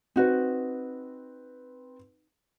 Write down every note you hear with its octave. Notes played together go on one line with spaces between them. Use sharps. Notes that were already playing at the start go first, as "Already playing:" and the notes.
C4 D#4 F#4 B4